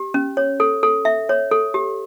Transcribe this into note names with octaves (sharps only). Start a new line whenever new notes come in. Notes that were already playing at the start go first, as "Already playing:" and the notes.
Already playing: G4
C#4
C#5
A4
A4
E5
C#5
A4
G4